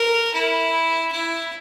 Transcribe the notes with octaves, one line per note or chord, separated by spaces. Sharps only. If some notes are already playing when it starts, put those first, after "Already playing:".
Already playing: A#4
E4
E4